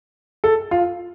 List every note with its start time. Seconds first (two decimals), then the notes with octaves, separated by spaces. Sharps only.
0.44 A4
0.71 F4